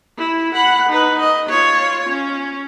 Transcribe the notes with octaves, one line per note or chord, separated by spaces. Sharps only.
E4
F#5 B5
D#4 B4
D#5
F4 C#5
C#4